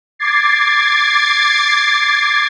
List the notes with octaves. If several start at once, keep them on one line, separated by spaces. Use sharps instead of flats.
D6 G#6 A6 C7